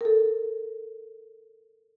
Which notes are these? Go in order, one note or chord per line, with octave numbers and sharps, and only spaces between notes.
A4 A#4